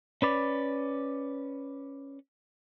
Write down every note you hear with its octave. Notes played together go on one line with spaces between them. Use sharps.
C#4 B4 D5